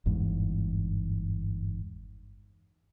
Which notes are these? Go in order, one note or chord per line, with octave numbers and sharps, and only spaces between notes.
G1 E2 G#2